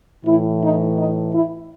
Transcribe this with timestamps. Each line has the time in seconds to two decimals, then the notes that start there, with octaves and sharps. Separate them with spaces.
0.24 A2 E3 E4
0.62 D#4
0.97 D#4
1.33 E4